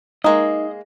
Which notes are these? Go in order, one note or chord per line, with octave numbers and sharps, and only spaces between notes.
G#3 A#3 D#4 A#4 D#5